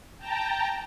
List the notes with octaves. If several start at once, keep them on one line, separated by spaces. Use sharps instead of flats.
G5 A5 A#5